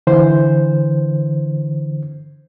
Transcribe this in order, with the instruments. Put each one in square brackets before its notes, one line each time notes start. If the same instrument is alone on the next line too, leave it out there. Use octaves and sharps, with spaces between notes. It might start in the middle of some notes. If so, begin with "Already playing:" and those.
[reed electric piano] D3 E3 C5